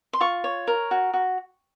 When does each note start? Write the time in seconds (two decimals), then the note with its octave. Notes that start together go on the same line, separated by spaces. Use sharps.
0.13 C6
0.21 F4 C#6
0.44 C#5
0.67 A#4
0.91 F#4
1.14 F#4